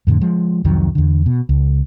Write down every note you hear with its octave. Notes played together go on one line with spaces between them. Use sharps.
F2 A2 D3
F3 G#3
C2 F2 D#3 F#3
E2 D3
B2
C#2